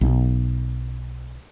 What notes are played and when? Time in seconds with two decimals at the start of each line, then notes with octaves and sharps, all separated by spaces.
0.01 B1